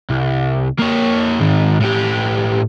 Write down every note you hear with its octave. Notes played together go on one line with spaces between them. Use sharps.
C2
A#3 C#5
G#2 D#3
A2 G4